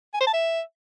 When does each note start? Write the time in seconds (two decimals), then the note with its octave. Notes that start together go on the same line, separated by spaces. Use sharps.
0.14 G#5
0.21 C5
0.27 A5
0.34 E5